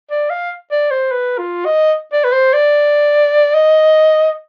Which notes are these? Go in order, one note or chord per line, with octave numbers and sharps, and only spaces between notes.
D5
F5
D5
C5
B4
F4
D#5
D5
B4
C5
D5
D#5